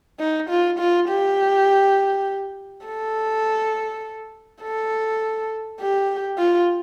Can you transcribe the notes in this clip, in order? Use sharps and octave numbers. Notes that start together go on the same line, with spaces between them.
D#4
F4
F4
G4
A4
A4
G4
F4